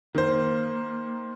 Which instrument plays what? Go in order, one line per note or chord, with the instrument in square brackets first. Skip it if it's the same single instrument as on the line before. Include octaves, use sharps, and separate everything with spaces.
[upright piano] D#3 C5 [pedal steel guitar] A#3